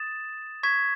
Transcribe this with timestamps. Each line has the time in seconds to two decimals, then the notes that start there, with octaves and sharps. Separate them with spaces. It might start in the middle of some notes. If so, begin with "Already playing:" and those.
Already playing: D#6 A6 E7
0.63 C#6 G#6 B6 E7